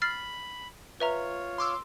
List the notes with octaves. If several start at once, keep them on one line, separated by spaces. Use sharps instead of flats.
B5 F6 A6 C7
F4 B4 C#5 E5 A#5
C6 D6 E6